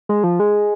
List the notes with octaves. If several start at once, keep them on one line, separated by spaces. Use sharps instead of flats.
G#3
F3
G#3